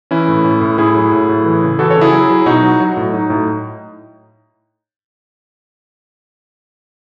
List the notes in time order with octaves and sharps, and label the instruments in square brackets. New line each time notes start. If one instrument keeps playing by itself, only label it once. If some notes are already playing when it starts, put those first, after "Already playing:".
[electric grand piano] E3 C#4 E4
A2
A2
A2
A2 E4 G#4
F#3
A2
A2
E3
C#3
E3 F#4 A4
A4 C#5
C#3
E4 G#4
F#3
F#3
B2 D#4 F#4
F#3
F#3
A2
F#3 D#4
A2